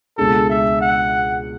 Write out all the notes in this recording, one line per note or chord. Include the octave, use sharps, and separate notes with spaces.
C#2 B2 G#3 D4 G#4 A4
E5
F#5